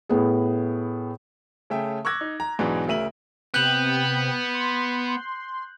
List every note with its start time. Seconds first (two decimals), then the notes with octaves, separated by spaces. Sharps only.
0.09 A2 B3 G#4
1.70 C#3 A3 C#4 E5 G5 G#5
2.05 C#6 D6 E6 F#6 G#6 A#6
2.21 D#4
2.40 A#5
2.59 B1 G#2 E3 D4
2.87 D2 C#3 A#4 E5 D#7 F#7
3.54 C3 B3 G5 F#6 G6 F#7
4.54 C6